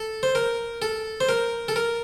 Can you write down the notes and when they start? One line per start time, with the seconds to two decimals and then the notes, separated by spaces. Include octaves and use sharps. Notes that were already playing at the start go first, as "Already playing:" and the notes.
Already playing: A4
0.23 C5
0.35 A#4
0.82 A4
1.21 C5
1.29 A#4
1.68 A4
1.76 A#4